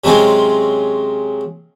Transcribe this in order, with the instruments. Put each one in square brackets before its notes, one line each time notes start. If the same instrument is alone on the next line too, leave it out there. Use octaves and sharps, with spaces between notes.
[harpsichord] C3 F#3 G#3 C#4 F4